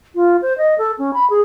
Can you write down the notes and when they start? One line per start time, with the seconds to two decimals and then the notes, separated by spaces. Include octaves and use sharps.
0.15 F4
0.42 C5
0.58 D#5
0.78 A4
0.98 C#4
1.14 B5
1.30 G#4